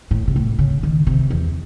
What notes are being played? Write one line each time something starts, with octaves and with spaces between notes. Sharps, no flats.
A2
C3
A2
C#3
D#3
C3
E2